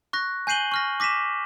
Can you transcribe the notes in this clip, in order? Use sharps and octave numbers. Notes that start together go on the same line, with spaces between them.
C#6 F#6 A#6
G#5 G6 C7 D#7 F#7 G7
C#6 F6 A#6
D6 A#6 B6 D#7 E7